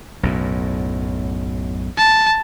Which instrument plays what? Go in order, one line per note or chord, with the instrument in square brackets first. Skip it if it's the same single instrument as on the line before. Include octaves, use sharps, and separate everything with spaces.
[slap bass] B1 F#2 A2
[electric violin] A5